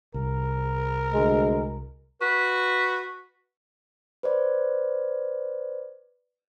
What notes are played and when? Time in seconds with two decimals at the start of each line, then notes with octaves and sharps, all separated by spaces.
0.14 C2 A#4
1.13 D2 G#3
2.21 F#4 B4
4.23 B4 C5 D5